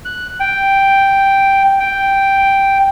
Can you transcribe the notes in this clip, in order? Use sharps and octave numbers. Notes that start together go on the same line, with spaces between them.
F#6
G5
G5